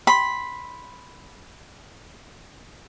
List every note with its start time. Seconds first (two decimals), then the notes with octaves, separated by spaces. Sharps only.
0.07 B5 C6